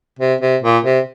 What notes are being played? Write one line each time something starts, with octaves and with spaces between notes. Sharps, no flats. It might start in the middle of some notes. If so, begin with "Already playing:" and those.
C3
C3
A#2
C3